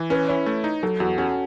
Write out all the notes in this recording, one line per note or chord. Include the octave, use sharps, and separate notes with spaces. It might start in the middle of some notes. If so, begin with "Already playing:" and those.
Already playing: E3
C#4 B4
E4 C#5
A3
D#4
F#3 A4
E2 F#4
C#4 F#4